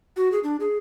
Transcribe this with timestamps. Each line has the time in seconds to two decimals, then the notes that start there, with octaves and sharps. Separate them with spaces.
0.17 F#4
0.32 G#4
0.44 D4
0.60 G#4